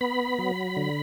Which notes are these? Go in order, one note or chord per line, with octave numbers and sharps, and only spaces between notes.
B3 B5
F#3
D3